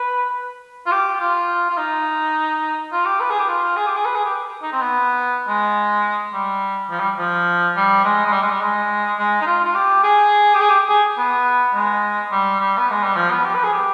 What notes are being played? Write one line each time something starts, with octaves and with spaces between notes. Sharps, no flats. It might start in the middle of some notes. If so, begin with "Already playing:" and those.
Already playing: B4
F4
G4
F4
F4
D#4
F4
G4
B4
G#4
G4
F4
G#4
G4
G#4
B4
G#4
G4
D#4
C4
B3
G#3
G3
F3
G3
F3
G3
G#3
G#3
G3
G#3
G3
G#3
G#3
D#4
F4
F4
G4
G#4
G4
G#4
G4
G#4
B3
G#3
G3
G3
B3
G#3
G3
F3
B3
G4
B4
G#4
G4